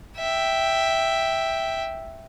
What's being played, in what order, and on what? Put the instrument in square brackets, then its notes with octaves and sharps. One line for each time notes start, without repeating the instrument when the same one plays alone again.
[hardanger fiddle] E5 G5